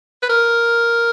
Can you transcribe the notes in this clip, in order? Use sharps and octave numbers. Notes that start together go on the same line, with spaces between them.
B4
A#4